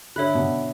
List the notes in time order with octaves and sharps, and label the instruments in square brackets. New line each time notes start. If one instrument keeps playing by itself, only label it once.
[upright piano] D3 [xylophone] A4 C#5 E5 B5 F#6
[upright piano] B2